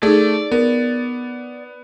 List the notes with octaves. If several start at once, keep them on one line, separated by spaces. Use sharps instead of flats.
A3 D#4 G#4 D5
B3 A#4